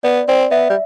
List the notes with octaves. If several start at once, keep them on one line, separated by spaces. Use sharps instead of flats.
B3 D5
C4 D5
B3 E5
G3